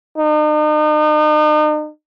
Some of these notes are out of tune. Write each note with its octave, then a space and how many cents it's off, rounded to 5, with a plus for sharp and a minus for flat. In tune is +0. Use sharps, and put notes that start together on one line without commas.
D#4 -40